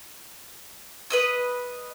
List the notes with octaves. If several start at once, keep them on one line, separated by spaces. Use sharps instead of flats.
B4 D#5 E6